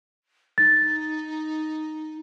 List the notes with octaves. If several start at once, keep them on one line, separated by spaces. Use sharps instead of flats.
D#4 A6